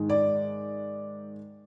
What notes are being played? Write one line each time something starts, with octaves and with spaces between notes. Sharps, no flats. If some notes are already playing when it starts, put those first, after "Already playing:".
Already playing: G#2 D#3 G#3
D5